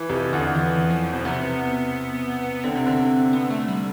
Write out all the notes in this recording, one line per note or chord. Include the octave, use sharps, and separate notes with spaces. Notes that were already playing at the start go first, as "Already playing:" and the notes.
Already playing: E3
F2 C3
E2 D3
E3
F3
B2
C3 B3
D3 C4
C3
D3
B3
A3
G3